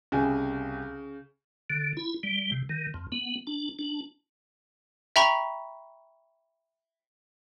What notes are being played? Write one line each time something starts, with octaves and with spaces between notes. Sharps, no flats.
C2 C#3 G4 G#5
D3
E4
G3
C3
D#3
F2
B3
D4
D4
E5 G5 A#5 B5 C#6